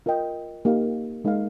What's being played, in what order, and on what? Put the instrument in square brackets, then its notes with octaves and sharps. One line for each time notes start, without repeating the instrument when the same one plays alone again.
[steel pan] F4 A#4 D#5 G5
A#3 D#4 G4 A#4 F5
G#3 D#4 A#4 F5